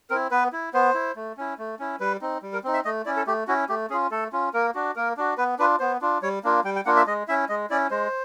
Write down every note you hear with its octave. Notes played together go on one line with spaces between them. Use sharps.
C4 E4 A#4
B3 B4
E4
B3 C5
E4
A3
C#4 E4
A3
C#4 E4
G3 B4
C4 D#4
G3
A#4
C4 D#4
E5
A3 D#5
C#4 E4 D5
A4
A3 G4
C#4 E4 F#4
A3 G4
C#4 F4 G#4
A3 A4
C#4 F4
A#3 A#4
D4 F#4
A#3 A#4
D4 F#4
B3 B4
D4 F4 B4
B3 C5
D4 F4
G3 C#5
A#3 D4 F4
G3 G5
G5
A#3 D4 F4 F#5
E5
G#3 D#5
C#4 E4 E5
G#3 D#5
C#4 E4 D5
G#3 C5